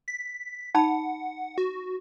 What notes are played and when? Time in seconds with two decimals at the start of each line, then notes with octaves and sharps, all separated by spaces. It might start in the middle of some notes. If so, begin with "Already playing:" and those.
0.08 B6
0.75 D#4 F#5 A5 B5
1.58 F#4